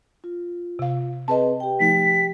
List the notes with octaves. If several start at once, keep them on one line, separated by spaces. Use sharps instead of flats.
F4
C3 F5
C4 G#4 B4 D#5 A5
G4 G5
F3 A3 D#4 B6